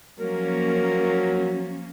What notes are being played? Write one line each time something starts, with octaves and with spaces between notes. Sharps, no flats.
F3 F#3 A#3 C#4 A#4